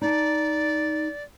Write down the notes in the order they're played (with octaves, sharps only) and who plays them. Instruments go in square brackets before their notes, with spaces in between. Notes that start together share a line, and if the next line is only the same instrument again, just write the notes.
[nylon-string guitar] D#4 A5 [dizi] D5